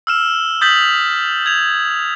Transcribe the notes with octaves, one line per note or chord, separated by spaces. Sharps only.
E6 F6 E7
D#6 G6 A6 B6 F#7
G#6 F7